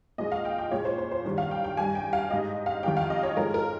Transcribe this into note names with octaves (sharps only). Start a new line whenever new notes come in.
A#2 F3 G#3 D#5
F5
G5
G5
A#2 G#3 C#5
C5
C5
C5
G2 D#3 G3
F5
G5
G5
G2 G3 G#5
G5
F5
G#2 G3 D#5
F5
F2 D#3 G3 G5
F5
D#5
C#5
G#2 F3 G#3 A#4
A#4